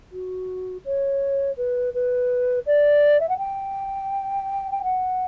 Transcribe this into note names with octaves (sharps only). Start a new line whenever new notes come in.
F#4
C#5
B4
B4
D5
E5
F#5
G5
G5
F#5